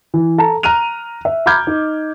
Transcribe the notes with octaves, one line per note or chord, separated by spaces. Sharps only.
E3
A4 A5 A#5
A#5 F6 F#6 D#7 F7
E5
A#5 B5 D6 F6 G6 G#6
D#4